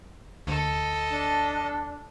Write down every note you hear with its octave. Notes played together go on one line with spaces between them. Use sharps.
D2 A4 D#5
D4